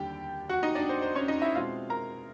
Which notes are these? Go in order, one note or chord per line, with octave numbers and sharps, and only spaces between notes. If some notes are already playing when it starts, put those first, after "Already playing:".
Already playing: D#2 D3 G3 D4 G4 G5
F#4 F#5
D#4 D#5
D4 D5
C5
C5
C#4 C#5
D#4 D#5
E4 E5
B2 G#3 C4 F4 F5
A#4 A#5